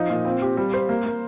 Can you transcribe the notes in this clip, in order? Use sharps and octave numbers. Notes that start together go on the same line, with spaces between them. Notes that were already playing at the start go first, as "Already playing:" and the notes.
Already playing: F3 D#4
A#2
C4
G4
G3
C5
A#3
A#3